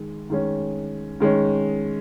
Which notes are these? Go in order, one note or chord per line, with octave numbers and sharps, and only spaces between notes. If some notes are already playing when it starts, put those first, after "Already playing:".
Already playing: D#3 G#3
D#3 G#3 C#4
D#3 G#3 C#4